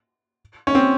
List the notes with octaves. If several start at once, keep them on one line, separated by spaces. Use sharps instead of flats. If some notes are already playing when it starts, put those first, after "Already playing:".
C#4
C4